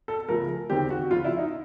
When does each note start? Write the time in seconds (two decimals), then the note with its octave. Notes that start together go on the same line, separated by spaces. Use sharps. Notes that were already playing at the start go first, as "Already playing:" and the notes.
0.08 A4
0.29 C#2 C#3 F3 A3 A#4
0.70 D#2 D#3 G#3 C4 G4
0.90 F#4
1.11 D2 C#3 F3 F4
1.24 E4
1.38 D#4